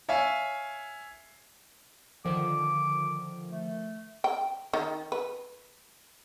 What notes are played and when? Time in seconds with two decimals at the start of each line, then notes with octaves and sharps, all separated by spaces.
0.09 C#5 E5 F5 G#5
2.25 D3 D#3 F3 D6
3.48 A3
4.24 G5
4.73 D#3
5.12 B4